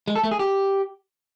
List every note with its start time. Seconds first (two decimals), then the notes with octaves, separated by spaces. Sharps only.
0.08 G#3
0.16 A4
0.24 A3
0.31 G#4
0.39 G4